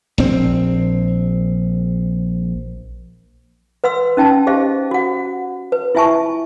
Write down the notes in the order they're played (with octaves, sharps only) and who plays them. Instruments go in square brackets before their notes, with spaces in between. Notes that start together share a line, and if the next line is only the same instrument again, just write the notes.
[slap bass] A#1 C4
[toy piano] B4 F#5 C6 E6
C#4 D#4 G5 A5
G4 G#4 C5 D#5 F5
F#4 F#5
B4
E4 F4 E5 G#5 A5 C#6